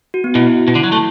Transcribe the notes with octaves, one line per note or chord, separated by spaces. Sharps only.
F#4
B3
B2 E4
B2
D3
F#3
A3